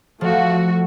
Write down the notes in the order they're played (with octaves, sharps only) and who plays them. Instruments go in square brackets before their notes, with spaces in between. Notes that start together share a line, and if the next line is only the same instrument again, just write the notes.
[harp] F3 [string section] A3 F#4